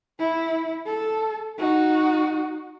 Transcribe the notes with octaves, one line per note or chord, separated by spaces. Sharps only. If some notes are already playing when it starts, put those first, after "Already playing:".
E4
A4
D#4 F#4